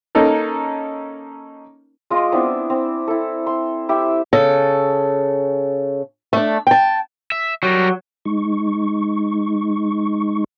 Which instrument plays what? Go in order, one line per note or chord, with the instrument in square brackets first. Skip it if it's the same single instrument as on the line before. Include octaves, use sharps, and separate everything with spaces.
[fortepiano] A#3 C#4 D#4 A4 A#4
[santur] G#3 F4 D#5 D6
B3 C4 D4 E4
C4
E4 A4
C6
E4 G4 E5
[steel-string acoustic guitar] C#3 A4
A3 D4
G5 A5
[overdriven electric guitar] E5
[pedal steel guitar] F#3 [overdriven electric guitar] G3 A#4
[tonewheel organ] G#3 D#4 C#6